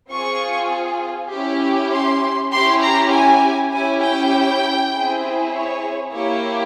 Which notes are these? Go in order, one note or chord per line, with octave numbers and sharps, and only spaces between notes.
C4 F4 G#4 C#6
C#4 E4 G4
C6
C#4 E4 G4 C6
A#5
G#5
C#4 E4 G4 G#5
G5
C4 E4 G#4
C#5
A#3 E4 G4 C#5